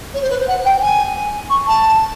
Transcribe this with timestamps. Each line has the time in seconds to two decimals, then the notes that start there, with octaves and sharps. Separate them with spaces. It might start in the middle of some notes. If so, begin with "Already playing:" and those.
0.13 C#5
0.22 C5
0.30 B4
0.39 C5
0.47 F#5
0.65 G5
0.82 G#5
1.50 C#6
1.67 A5